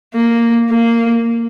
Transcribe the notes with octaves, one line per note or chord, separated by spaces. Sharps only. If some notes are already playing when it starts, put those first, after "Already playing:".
A#3
A#3